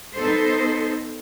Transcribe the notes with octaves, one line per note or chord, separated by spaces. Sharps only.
B3 D#4 A4 C5